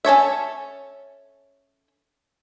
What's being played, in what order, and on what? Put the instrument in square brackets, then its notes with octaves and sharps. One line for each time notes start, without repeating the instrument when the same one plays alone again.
[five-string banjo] C#4 A4 C#5 E5